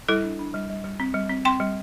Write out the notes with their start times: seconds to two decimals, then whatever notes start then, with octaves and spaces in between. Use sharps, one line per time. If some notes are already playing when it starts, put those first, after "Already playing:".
0.09 G3 E4 A4
0.24 D4
0.39 D4
0.54 G3
0.70 G3
0.84 G3
1.00 C4
1.14 G3
1.30 C4
1.45 C4 G5 C6
1.60 G3